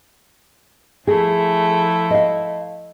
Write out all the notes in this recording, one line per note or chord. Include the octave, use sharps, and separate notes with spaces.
F3 A3 E4 G#4
D#5 F5